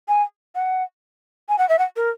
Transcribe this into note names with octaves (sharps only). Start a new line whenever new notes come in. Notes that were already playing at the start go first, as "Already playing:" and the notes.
G#5
F#5
G#5
F#5
E5
F#5
A#4